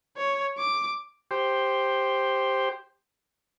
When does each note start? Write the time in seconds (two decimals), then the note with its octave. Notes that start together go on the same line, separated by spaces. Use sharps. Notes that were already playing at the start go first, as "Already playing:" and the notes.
0.16 C#5
0.58 D6
1.31 G4 C5